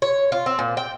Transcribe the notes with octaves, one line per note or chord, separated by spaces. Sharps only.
C#5
F4
C4
A#2
G5